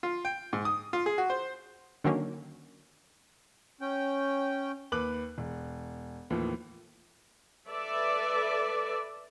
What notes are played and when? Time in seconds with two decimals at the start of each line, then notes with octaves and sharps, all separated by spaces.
0.03 F4
0.25 G5
0.53 G#2
0.65 D#6
0.93 F4
1.06 G#4
1.18 F#4
1.30 C5
2.04 D3 D#3 F#3 A#3 C#4
3.81 C#4 G5
4.92 D#2 B4 D6 F#6 F#7
5.38 E1
6.30 D#2 A2 E3 F3
7.68 A4 B4 D5 E5